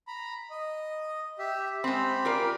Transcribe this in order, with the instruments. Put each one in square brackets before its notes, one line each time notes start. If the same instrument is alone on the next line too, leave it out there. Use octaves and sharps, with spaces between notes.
[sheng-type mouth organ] A#5 B5
D#5
G4 E5
[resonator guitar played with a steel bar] G#3 C4 [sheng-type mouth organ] G4 B5
[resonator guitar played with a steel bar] F4 A#4 D5